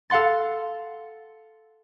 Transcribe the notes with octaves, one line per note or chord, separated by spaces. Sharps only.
A4 F5 F#5 C6 A6